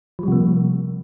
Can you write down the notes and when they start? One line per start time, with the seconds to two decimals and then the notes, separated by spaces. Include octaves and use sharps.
0.19 F3
0.23 G3
0.28 C3
0.32 A#3